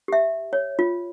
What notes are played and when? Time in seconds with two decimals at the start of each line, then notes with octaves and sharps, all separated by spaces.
0.08 G4 E5
0.53 C#5
0.79 F4